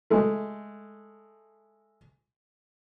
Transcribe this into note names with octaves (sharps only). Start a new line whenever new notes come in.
G#3 A3